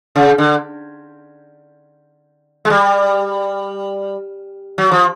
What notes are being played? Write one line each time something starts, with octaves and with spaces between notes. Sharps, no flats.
C#3
D3
G#3
G3
F#3
F3